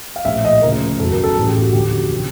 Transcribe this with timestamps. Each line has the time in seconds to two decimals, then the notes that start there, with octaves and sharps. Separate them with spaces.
0.16 F5
0.25 A#1 A2 F3 E5
0.45 D#5
0.62 D2 C#3 F3 A#4
1.00 F#1 E2 B2 F#3 A4
1.12 A#4
1.24 A4
1.37 A1 A2 E3 G#4
1.48 G4
1.61 F#4
1.73 D#2 D3 F3 G4
1.85 F#4
2.12 C3 F3